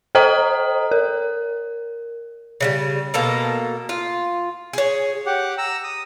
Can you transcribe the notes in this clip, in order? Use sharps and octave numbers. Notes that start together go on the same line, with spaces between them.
A4 C5 D#5 G5 A#5 D#6
A#4
C#3 E3 G3
B2 A#3 A4 A#5
F4
G#4 C#5
G4 F#5
A#5 E6
D#6